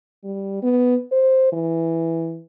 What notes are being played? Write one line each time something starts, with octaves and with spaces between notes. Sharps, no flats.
G3
B3
C5
E3